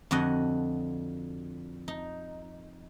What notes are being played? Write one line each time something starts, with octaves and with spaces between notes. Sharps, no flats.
F2 D3 F#4 D#5
D#4